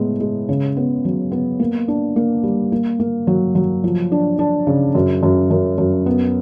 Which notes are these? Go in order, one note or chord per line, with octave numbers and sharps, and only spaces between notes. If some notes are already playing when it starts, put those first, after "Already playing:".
Already playing: A2 G#3 B3
G#3
C#3
B3
F#3
B3
A#3
D4
A#3
G3
A#3
A#3
F#3
F#3
F3
D4
D4
C#3
F#2
F#2
F#2
F#2
B3